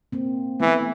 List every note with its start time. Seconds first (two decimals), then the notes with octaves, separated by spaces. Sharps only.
0.12 A#3 C4
0.60 E3 A3 B3